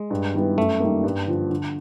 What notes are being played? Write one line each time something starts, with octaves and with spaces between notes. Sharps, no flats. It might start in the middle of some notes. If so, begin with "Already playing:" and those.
Already playing: G#3
G2
D#3 G3 B3 E4
F#2 A3
D#3 G3 A#3
G2
D3 F3
D3